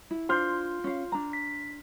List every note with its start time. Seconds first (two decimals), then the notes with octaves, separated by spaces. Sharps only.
0.11 E4
0.29 D4 F4 C5 C6 F6 G6
0.84 C#4 F5
1.12 D4 A#5
1.33 B6